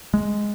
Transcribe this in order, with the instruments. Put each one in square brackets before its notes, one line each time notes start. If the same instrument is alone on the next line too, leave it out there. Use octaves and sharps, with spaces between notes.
[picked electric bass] G#3